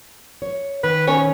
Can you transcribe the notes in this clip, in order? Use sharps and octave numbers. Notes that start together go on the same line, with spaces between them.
C#5
D#3 B4
C#4 C#5